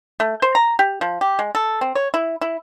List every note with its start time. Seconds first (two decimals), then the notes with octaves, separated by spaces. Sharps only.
0.20 A3
0.42 C5
0.55 A#5
0.79 G4
1.01 F3
1.21 G4
1.39 G#3
1.55 A4
1.81 C4
1.95 C#5
2.14 E4
2.41 E4